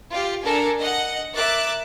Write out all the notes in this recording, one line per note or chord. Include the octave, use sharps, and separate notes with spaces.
F4 G4
D4 A4 A#4 G#5
D#5 F#5
A#4 E5 D6 F#6 A6